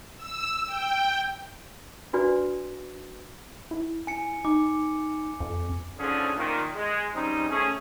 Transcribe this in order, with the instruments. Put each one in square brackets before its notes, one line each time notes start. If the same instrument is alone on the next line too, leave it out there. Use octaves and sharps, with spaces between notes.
[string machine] E6
G5
[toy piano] D4 F#4 B4 D5 G#5
[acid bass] E4
[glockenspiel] G#5 C#7
[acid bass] D#4 [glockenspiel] D6
[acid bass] F2
[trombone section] G#2 D3 F3 C#4 D4 G#4
A#2 D#3
G#3
G#2 G3 C4 C#4 D#4
A3 C#4 G#4